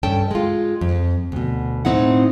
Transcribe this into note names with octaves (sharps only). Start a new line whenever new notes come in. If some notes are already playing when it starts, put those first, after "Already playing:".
G2 C#4 A4 G5 A5
G#3 F4
F2
D2 B2
A2 C4 D#4 E4 F#5